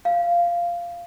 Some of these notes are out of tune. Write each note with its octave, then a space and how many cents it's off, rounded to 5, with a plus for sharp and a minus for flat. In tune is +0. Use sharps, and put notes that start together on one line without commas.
F5 -10